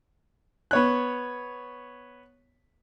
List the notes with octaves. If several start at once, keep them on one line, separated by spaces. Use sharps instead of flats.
B3 C#5 F#6